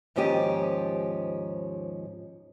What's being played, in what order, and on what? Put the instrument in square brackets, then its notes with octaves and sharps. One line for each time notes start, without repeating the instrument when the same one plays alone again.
[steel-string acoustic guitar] D#2 G#2 F3 C#4 G4 D#5